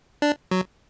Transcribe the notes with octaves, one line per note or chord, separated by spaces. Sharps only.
D4
F#3